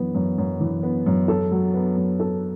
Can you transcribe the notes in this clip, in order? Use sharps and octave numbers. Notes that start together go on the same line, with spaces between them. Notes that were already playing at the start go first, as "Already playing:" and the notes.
Already playing: F#2 E3 B3
F#2
F#2
E3
B3
F#2
A4
F#3
B3
F#2
A4